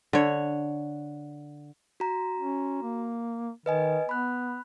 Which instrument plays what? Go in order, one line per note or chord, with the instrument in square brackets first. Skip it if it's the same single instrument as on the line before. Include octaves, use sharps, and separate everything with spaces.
[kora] D3 C#5
[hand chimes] F#4 A#5
[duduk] C#4
A#3
[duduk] D#3 [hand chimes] B4 D#5 G#5
[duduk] B3 [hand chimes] B5 F#6